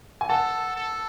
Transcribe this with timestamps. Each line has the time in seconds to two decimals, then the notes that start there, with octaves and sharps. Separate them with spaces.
0.21 G#5
0.29 A4 F#5 A5
0.76 A4